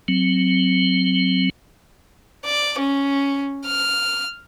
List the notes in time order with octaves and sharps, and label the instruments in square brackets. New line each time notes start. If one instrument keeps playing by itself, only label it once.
[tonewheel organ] F#3 C4
[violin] D5
C#4
F6